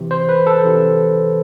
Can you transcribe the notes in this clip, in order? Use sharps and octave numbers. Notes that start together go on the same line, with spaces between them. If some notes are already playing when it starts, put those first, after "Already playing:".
Already playing: C3 E3
C5
B4
A4
C3 E3